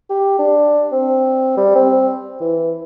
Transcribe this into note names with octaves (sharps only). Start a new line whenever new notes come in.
G4
D4
C4
G3
C4
E3